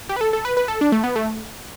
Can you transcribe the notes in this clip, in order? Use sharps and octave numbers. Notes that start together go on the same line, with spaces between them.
G4
B4
A4
A4
B4
B4
A4
D4
A3
B3
A3